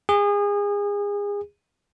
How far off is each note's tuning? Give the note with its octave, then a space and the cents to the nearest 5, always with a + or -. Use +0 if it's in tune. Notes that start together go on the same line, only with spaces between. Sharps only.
G#4 -30